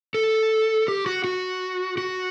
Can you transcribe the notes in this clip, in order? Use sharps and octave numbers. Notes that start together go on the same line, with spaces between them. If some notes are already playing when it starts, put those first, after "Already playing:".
A4
G4
F#4
F#4
F#4